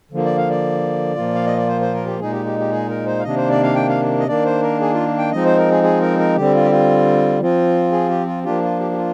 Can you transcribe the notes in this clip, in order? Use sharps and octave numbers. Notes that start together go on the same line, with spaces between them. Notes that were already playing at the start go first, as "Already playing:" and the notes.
D3 F3 A#3
D5
F5
D5
A#2 F3 A#3 F4
F5
D#5
D5
C5
C5
A#4
G4
A#2 G#3 D#4 G#4
G4
G4
G4
G#4
A#4
C5
F5
C3 D#3 A#3 D4 D#5
C5
D5
F5
G5
F5
D#5
D#3 A#3 D4 D5
C5
A#4
G#4
F4
G5
F3 G#3 C4 D#4 D#5
C5
A#4
G#4
G#4
A#4
A#4
D3 G3 C4 G4
F4
G4
F4
F3 C4 F4
G#4
G4
F4
F3 A#3 D4 F4 G4
F4
G4
G4
F4